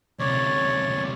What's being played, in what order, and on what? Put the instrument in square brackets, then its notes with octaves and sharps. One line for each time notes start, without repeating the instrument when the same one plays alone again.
[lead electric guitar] D2 C3 [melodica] C#5 D5